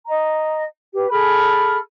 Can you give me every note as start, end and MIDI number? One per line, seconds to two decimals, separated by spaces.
0.07 0.62 75
0.07 0.62 82
0.93 1.06 67
0.93 1.06 71
1.10 1.77 68
1.10 1.77 69
1.10 1.77 83
1.10 1.77 89